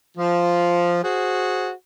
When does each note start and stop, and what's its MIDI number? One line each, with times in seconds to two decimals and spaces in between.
0.18 1.00 53
1.03 1.69 66
1.03 1.69 68
1.03 1.69 72